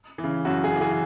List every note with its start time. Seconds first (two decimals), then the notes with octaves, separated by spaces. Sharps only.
0.18 E3
0.24 C#3
0.45 F#2 F#4
0.64 G#4
0.72 C#3 E3
0.81 G#4